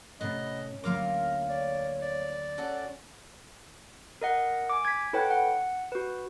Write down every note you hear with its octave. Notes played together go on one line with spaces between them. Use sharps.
A2 C3 B3 C#4 D#5
D2 F#3 A#3 F4 A#4 F5 D6
C#5 D5
D5
C#4 F#4 A4
A#4 D#5 F#5
G#5 D6
G#6 B6
E4 A4 B4 C#5 F#5 G5
F#5
F#4 B4